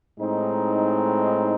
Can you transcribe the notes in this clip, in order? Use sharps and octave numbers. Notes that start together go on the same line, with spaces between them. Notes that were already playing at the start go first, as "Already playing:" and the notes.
A2 G#3 C4 D#4